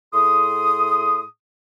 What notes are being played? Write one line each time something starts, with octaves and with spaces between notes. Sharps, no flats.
A2 G#4 C6 D#6